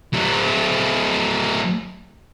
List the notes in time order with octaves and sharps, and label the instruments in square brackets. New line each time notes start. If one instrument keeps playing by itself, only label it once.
[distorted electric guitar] F#3 A3